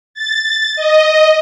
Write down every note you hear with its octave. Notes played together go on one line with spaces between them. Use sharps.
A6
D#5